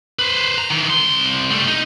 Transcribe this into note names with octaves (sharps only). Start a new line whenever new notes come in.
B4 C5
A#5
D#3 E3
C2 C6
G3 A3
D#4